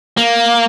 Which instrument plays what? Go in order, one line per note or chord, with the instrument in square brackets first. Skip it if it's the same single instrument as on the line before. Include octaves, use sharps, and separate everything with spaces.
[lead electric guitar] A#3